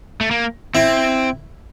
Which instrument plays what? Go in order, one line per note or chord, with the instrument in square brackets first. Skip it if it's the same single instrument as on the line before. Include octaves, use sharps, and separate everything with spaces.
[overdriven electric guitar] A3
A#3
[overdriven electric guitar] C4 [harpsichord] E4